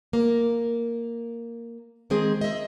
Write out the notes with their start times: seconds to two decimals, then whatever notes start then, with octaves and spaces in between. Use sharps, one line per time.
0.13 A#3
2.10 D#3 G#3 C4 G#4
2.41 D#5 E5